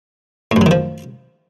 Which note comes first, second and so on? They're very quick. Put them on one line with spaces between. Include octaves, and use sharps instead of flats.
A2 F#2 F#3 D#3 F3